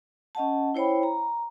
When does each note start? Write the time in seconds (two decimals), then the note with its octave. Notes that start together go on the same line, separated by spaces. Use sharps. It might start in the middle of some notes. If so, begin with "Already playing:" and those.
0.35 C#4 D#5 F#5 A5
0.74 E4 C5 C#5 G5 B5
1.03 A#5